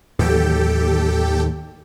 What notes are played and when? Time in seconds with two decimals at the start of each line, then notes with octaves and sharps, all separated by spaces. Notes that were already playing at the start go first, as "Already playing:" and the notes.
0.19 D#2 A2 E3 F#3 G4 A4 G5